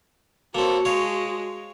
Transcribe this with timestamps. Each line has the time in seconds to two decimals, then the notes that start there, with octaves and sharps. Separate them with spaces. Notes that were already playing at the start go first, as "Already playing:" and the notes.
0.55 A#3 C4 F#4 A4 C#5
0.85 G#3 C#5 F5